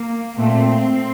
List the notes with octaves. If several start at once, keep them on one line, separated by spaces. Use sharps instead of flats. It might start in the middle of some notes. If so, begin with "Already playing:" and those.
Already playing: A#3
A#2 A3 C4